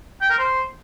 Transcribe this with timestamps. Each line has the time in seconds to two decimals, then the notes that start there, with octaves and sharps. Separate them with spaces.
0.21 G5
0.30 A#4
0.38 C5